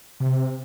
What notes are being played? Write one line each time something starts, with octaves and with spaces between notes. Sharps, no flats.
C3